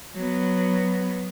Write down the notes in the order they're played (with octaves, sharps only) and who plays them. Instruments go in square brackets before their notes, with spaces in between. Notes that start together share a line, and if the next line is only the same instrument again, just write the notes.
[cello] F#3 B3